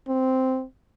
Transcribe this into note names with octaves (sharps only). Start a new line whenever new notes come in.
C4